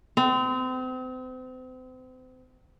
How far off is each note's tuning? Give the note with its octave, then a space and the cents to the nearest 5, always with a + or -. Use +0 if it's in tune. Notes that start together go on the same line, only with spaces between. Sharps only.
C4 -35